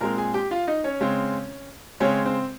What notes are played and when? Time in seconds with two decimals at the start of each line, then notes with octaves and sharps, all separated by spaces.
0.01 A#2 G#3 C4 A#4 A#5
0.18 G#4 G#5
0.34 G4 G5
0.51 F4 F5
0.68 D#4 D#5
0.84 C#4 C#5
1.00 C#3 G#3 C4
2.00 C#3 G#3 C4 C#4 C#5
2.25 C4 C5